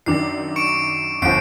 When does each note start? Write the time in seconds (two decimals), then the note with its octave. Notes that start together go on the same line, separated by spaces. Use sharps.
0.06 F#2 D#3 D4 D6 C7
0.56 C#6 C#7 D7
1.22 G1 F3 C7 D7